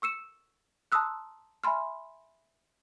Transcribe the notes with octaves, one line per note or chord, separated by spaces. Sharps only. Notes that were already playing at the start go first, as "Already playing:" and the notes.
C#6 E6 C#7 E7
A5 A#5 C6 D#6 E6 F#6
E5 G#5 B5 C6 F6